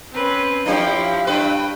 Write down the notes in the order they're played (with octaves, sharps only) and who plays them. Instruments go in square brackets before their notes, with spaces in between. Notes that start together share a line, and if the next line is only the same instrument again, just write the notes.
[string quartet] C4 C#4 B4
[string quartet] F3 E4 [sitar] D4 G4 [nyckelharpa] C#5 G5 [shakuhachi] F5
[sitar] G2 D4 B4 [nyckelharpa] G5